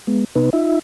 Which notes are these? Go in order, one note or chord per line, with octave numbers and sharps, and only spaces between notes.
G#3 B3
C3 B3 D#4 B4
D#4 F4 E5